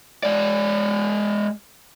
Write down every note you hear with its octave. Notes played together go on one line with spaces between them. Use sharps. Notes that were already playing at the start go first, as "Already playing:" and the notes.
G#3 D5